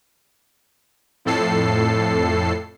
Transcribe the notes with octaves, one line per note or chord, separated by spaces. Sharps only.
F2 A2 A4 C7